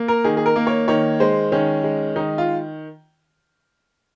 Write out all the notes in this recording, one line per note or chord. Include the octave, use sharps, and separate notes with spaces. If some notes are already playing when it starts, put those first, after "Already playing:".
Already playing: A#3
A#4
D#3 G#4
G#4
A#4
A#3
C#5
D#3 C#5
G#3 C5
D#3 C#4
G#3
D#3 D#4
F4